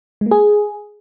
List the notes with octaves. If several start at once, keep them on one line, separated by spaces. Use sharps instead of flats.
G#3
A#3
G#4